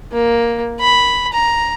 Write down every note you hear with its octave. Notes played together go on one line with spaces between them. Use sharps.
A#3
B5
A#5